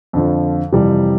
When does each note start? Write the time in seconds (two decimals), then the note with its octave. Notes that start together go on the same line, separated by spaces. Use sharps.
0.13 F2 D3 F3
0.72 F2 C3 E3 G3